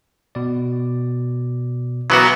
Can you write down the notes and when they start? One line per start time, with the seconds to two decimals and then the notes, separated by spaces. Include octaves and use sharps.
0.35 B2 D5
2.10 E3 F#3 A#3 B3 F#4